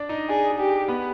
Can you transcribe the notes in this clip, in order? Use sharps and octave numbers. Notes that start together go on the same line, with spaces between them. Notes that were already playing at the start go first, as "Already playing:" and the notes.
Already playing: D4 D5
D#4 D#5
D4 G#4 D5
G4
B3 B4